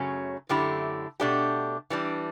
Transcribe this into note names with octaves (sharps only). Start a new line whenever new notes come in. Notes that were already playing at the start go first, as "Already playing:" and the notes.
Already playing: F#2 C#3 F#3 A3 C#4
F#2 D3 A3 E4 G4
B2 A3 D4 G4
E3 G3 D4